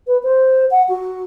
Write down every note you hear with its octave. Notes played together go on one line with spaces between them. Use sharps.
B4
C5
F#5
F#4